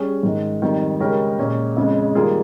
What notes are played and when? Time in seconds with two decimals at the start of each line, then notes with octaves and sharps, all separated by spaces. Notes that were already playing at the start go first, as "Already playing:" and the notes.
Already playing: G3 C#4 G#4
0.23 G#2 D#3 G#3
0.62 F2 D#3 G3
1.00 C#3 G#3 C#4 G4 A#4
1.39 A#2 G#3 C#4
1.77 F2 C#3 G#3
2.15 D#3 G3 A#3 F4 G#4